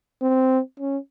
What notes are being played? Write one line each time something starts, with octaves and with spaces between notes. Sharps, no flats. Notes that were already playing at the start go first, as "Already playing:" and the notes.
C4
C#4